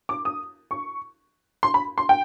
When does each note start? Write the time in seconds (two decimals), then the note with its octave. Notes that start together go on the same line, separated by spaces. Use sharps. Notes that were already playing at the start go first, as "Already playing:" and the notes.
0.09 D6
0.25 D#6
0.71 C#6
1.63 C6
1.74 B5
1.98 C6
2.09 G5